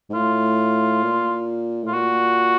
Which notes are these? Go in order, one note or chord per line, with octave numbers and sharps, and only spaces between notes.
G#2
A2 F4
A#2
A2 F4
A#2 F#4